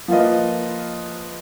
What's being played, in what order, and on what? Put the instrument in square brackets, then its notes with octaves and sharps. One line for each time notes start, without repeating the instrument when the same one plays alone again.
[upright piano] F3 A#3 F4 B4 D#5